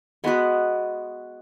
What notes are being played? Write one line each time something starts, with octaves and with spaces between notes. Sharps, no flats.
G#3 B3 F#4 B4